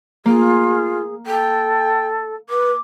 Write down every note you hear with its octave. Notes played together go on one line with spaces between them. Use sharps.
A#3 F4 G#4
A4 G5
B4 D6